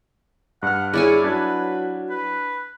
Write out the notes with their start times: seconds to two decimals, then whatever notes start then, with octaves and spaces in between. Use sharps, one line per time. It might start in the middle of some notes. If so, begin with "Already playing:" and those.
0.63 G2 F#5 F6
0.93 E4 G#4 C#5 D5 G#5
1.24 F#3 D4 B4 F#6 G#6
2.10 B4